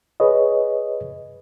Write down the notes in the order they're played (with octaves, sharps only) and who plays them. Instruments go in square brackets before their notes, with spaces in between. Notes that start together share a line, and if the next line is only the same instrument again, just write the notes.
[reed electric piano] G#4 B4 C#5 D#5